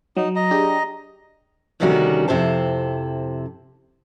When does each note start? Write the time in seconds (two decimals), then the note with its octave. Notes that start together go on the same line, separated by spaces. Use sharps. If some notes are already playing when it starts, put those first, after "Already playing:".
0.17 F#3 D#4
0.36 D#5 A#5
0.51 D4 G4 G#4
1.80 D2 C3 D#3 G3 C#4 F#4
2.28 F2 G#2 C3 E4 C5 A5